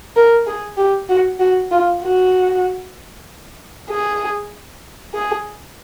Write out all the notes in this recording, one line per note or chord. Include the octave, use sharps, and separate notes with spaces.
A#4
G#4
G4
F#4
F#4
F4
F#4
G#4
G#4